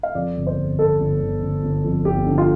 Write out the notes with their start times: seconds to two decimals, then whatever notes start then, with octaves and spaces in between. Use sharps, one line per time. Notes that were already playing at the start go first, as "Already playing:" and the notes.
0.03 F5
0.15 F2 D5
0.36 G1
0.47 C5
0.57 G1
0.78 G1 A4
0.99 G1
1.20 G1
1.42 G1
1.63 G1
1.84 F2
2.05 G1 G4
2.26 D3
2.38 F4